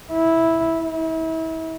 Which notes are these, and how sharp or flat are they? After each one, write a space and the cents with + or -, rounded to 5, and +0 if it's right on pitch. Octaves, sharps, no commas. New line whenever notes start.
E4 -10
E4 -35